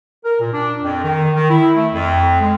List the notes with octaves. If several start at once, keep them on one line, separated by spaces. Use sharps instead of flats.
A#4
A#2
D4
F2
D#3
D#3
E4
A3
F2
G#3